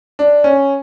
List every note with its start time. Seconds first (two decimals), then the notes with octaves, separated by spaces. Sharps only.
0.19 D4
0.44 C#4